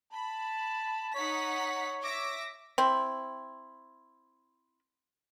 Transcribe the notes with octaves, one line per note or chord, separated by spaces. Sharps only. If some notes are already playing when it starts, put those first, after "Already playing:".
A5 B5
D#4 C#5 F#5 B6
E5 D6 A#6
C4 E4 C6